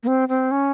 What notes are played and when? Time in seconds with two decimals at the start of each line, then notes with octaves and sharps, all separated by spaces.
0.03 A#3
0.07 C4
0.29 C4
0.51 C#4